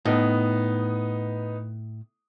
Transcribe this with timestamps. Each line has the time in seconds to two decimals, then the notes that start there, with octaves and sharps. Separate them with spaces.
0.05 A2 B3 D#4